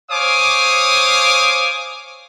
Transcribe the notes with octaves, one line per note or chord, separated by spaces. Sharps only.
C5 C#5 F5 G#5 D6 D#6